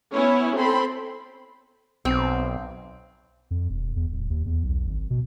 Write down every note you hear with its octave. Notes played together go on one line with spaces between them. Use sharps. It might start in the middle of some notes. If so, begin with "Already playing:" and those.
B3 C#4 E4 C#5
C4 A4 B5 C6
B1 C4
F2
E1
E2
D1
D#2
E2
B1
G#1
B2